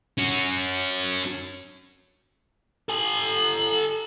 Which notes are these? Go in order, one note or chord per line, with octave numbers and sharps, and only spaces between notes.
C#4 F#4
A4 G#5